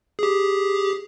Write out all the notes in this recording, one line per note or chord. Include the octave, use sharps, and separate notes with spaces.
G4 G#4